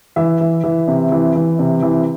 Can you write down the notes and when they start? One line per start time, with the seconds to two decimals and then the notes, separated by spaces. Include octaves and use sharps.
0.16 E3 E5
0.41 E3
0.64 E3
0.88 C3
1.12 E3
1.36 E3
1.59 C3
1.83 E3